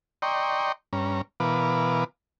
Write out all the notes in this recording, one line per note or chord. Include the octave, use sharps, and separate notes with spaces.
D5 D#5 G5 A#5 C6 C#6
G2 C#4 A#5
B2 E3 A#4 B4 F5 D6